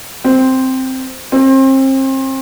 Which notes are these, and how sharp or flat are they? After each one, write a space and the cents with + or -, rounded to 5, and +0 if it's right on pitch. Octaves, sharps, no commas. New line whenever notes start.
C4 +0
C4 +35